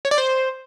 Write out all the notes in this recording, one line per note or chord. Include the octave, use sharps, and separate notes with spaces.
C#5
D5
C5